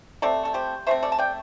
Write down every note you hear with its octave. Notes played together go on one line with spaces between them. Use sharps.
C3 A3 C4 A4 D5
A4
G4 C5
C3 A3 C4 C5 E5
A4 D5
A5
D5 G5